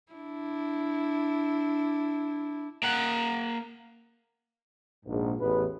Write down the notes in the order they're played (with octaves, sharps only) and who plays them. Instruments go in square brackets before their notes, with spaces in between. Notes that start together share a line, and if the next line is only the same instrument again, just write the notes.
[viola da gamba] D4 E4
[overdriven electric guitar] A#3 F#5
[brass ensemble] A#1 G#2
A1 E2 B3 B4